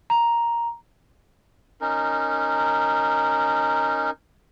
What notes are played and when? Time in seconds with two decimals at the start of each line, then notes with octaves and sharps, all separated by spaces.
0.10 A#5
1.80 C#4 D#4 A#4